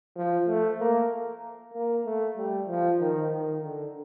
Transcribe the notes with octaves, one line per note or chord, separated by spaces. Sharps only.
F3
A3
A#3
A#3
A3
G3
F3
D#3
D#3
D3